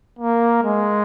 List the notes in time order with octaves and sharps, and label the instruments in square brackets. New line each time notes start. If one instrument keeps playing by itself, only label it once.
[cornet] A#3
G#3